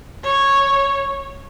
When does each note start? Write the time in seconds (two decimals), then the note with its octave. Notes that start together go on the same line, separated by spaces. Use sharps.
0.23 C#5